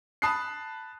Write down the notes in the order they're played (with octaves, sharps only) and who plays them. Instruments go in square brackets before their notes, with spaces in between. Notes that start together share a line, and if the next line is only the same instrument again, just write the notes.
[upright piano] A5 B5 D#6 F#6 C7